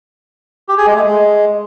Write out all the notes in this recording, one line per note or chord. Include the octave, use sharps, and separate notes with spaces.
G4
G#4
G#3
A3
G#3